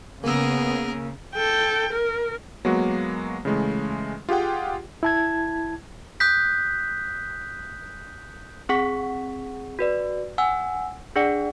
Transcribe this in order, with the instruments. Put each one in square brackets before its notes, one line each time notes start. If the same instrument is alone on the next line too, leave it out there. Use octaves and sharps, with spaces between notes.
[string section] C#3 [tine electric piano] A#3 E6 [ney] B3 [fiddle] G#4 A#4
[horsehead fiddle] A4 G5
A#4
[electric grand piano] F#3 G#3 A#3 B3 F#4
C#3 E3 G#3 A3
F4 G4 G#4 F#5 G5
[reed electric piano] E4 A5 G#6
[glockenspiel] D#6 F#6 G6 B6
[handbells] C4 G#4 F#5 C#6 B6
F#4 B4 D5
F#5 G#5 E6
D4 G#4 D5 F#5 C#7